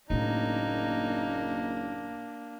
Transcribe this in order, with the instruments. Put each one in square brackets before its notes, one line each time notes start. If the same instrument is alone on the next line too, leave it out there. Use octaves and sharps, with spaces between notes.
[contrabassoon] F#1 [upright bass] A2 A3 [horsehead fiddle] A#3 D4 [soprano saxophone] D#4